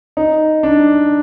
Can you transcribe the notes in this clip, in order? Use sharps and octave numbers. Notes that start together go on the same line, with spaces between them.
D#4
D4